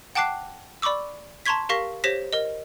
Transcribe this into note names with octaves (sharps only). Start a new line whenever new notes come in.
F#5 G5 A5 D6 F#6 C7
D5 B5 C#6 D6 E6
A5 A#5 C6 C#6 G#6 B6
G4 A#4 F5 C#6 A#6 B6
G4 C5 C#5 A#6 B6
A#4 D#5